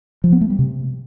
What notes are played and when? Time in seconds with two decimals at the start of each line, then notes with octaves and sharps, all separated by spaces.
0.24 F3
0.32 B3
0.41 A3
0.50 G3
0.59 C3